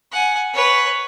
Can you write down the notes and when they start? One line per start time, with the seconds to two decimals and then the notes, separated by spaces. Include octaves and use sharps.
0.12 F#5 G#5
0.54 B4 C#5